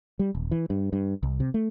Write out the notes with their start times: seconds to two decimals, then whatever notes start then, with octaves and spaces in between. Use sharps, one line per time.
0.19 G3
0.35 D#1
0.51 E3
0.70 G2
0.93 G2
1.23 C2
1.40 C3
1.54 A3